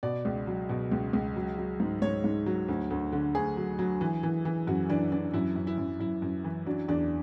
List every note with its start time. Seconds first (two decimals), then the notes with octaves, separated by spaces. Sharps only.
0.03 B2 D5
0.25 C#2
0.47 F#3
0.69 B2
0.91 C#2
1.13 C#2
1.36 F#3
1.58 F#3
1.80 G#2
2.02 G#2 C#5
2.24 G#2
2.46 F#3
2.68 D2
2.90 D2
3.12 D3
3.35 D2 G#4
3.57 F#3
3.79 F#3
4.01 E3
4.23 E3
4.45 E3
4.67 F#2 F#4
4.90 E3 D4
5.12 E3 D4
5.34 F#2 E4
5.56 F#2
5.67 E4
5.78 F#2
6.00 F#2 E4
6.22 F#2
6.44 E3
6.67 F#3 D4
6.88 E2 D4